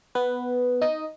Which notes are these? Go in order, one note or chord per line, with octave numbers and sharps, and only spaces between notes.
B3 B4
D#4 D#5